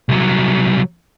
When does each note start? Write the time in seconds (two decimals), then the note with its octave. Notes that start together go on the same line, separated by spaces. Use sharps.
0.09 C2 F#3